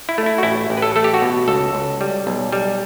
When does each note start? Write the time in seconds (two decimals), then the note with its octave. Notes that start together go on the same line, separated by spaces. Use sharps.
0.09 E4
0.18 A3
0.26 E4
0.38 F#4
0.43 A1 E4
0.70 A1
0.77 B4
0.82 A4
0.96 A3 A4
1.04 G4
1.14 F#4
1.22 B2
1.48 C#2 A4
1.75 C#2
2.01 G3
2.27 B1
2.52 G3